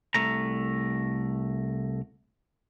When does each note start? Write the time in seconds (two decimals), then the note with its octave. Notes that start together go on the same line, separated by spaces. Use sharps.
0.15 C2 A3 A#5